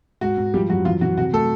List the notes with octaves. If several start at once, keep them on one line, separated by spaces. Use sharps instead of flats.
G#2 F#4
G#2
F3 G3 G4
F#2 F#4
E3 F4
E3 F#4
C3 F#4
A3 A4